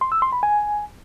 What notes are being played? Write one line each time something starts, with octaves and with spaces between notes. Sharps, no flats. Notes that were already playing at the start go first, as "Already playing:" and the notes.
C6
E6
C6
B5
G#5